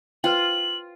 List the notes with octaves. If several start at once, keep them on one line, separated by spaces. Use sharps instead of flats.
F4 B4 C5 G5 F#7